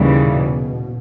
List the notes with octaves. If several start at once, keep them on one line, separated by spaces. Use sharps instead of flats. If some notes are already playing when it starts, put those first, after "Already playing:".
Already playing: D#2 C#3 E3 G3
B2